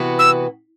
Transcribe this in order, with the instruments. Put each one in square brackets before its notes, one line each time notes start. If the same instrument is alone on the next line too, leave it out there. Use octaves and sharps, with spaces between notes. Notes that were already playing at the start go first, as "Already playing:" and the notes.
Already playing: [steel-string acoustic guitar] C3 E3 B3 F#4
[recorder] E6